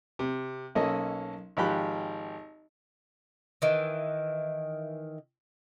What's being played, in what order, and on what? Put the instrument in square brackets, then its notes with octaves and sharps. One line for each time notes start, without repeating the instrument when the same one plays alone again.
[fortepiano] C3
B1 A#3 C#4 A4 D#5
G#1 F3 G4 B5 F#6
[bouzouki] D#3 E3